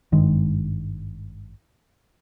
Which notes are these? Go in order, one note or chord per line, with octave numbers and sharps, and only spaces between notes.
G#1 G2 D#3 G#3